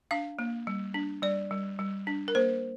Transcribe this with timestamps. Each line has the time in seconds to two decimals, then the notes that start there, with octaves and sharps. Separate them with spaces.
0.11 D4 F5
0.39 A#3
0.67 G3
0.94 D4
1.22 G3 D5
1.51 G3
1.79 G3
2.07 D4
2.28 A#4
2.35 A#3 C5